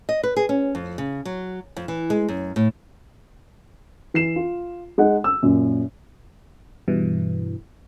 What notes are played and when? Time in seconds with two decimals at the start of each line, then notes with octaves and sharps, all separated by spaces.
0.09 D#5
0.23 B4
0.37 G#4
0.49 C#4
0.75 F2
0.98 C#3
1.25 F#3
1.77 F2
1.88 E3
2.10 G#3
2.29 F#2
2.56 A2
4.14 E3 C7 E7
4.36 F4
4.98 G#3 D#4 F#5
5.24 E6
5.43 F#2 A#2
6.88 G2 B2 E3